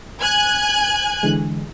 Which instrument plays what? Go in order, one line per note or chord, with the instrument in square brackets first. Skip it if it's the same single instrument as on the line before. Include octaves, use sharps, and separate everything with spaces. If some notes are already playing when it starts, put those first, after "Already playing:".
[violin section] G#5 F#6 G#6
[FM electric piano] D3 E3 G#3